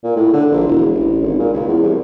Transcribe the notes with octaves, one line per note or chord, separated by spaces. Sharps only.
A#2
A2
D3
A#1
E1
A1
G#1
A#2
C#2
E2
C2